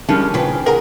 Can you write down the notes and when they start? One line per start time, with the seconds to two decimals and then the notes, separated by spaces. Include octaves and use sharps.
0.09 D3 D#3 F3 G3 G#3 C#4
0.34 C#3 F3 B4 G5
0.66 G#4 A#4 F#5 A#5